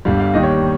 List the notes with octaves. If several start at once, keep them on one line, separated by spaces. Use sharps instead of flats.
G1 G2 G3 F5
F5
D#2 D#3 G3 D#5
C#5